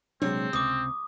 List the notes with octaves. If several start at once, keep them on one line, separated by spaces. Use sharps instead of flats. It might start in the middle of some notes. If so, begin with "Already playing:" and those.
A#1 C3 F#3 G#3 C4 D4 C#5
C#2 C3 D6 D#6